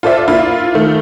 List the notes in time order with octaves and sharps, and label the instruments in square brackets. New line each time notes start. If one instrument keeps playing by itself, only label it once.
[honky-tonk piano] F4 A4 C5 D5 E5
A#3 E4 F4
D#3 A3